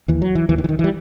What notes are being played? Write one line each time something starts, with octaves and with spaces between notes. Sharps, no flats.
D#2 E3
F#3
E3
D#2 E3
D#3
E3
D#3
E3
G3